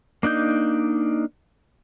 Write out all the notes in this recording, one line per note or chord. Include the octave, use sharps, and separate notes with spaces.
A#3 D4 D#4 G6